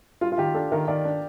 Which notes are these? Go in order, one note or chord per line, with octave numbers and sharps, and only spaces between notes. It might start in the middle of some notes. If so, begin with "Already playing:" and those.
G3 F4
F4
D#3 G4
D4 A4
D#3 A#4
D#3 D5
D4